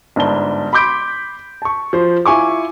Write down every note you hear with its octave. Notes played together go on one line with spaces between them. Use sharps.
G1 G#2 D4 A5 G7
B5 C6 D6 G6 B6 D7
A5 C#6
F3 C5
E4 F4 G#5 C#6 D6